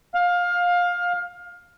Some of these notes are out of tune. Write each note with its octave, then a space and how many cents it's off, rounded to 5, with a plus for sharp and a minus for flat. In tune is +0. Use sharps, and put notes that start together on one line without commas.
F5 +20